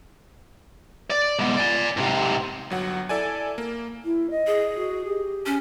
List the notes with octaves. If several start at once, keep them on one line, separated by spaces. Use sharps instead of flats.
D5
G#3 B3
D5 G#5
G#2 C3
G1 F#3 F#5
E4 A4 D5 G#5
A#3
E4
D#5
G#4
F#4
G4
C#4